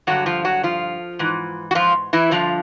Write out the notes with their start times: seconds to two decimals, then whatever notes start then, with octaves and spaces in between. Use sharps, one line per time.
0.07 G2 D3 F#3 F#4
0.26 F3 F4
0.45 F#3 F#4
0.63 F3 F4
1.19 G#2 E3
1.71 F#4
1.75 F3 F4
2.13 E3 E4
2.31 G2 D3 F3 F4